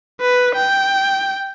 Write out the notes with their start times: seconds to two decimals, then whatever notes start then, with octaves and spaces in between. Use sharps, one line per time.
0.20 B4
0.55 G5